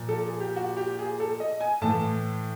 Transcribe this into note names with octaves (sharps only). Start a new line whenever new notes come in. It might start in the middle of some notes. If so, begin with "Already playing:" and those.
Already playing: A#2 F3
A4
G#4
G4
F#4
G4
G#4
A4
D#5
G#5
A2 E3 A5